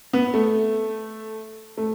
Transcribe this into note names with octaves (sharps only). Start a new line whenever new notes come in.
B3
A3
A3